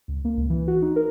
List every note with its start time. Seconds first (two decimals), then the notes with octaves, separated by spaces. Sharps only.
0.08 C#2
0.25 A#3
0.37 C#2
0.50 E3
0.68 F#4
0.82 D#4
0.96 A#4